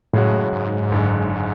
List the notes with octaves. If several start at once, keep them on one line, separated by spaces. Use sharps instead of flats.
F#2 A2 C#3 G#3 C#4 F#4
G#2
F#1 F#2 D3 G#3